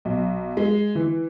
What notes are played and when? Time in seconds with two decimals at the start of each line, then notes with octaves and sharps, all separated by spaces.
0.05 B1
0.57 G#3
0.95 E3